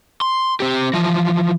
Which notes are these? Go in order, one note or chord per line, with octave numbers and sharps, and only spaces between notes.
C6
C4 G4
E3 F3